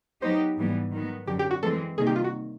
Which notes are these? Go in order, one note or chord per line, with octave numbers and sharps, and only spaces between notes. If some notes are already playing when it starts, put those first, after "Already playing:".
F#3 B3 D#4 G4 C5
G#2 E3 G3 B3
D#3 F#3 B3
F#2 D3 F#3 G4
G4
F#4
E3 G#3 C4 A4
C3 D#3 G3 A#3 D#4 G#4
G4
F4
F#4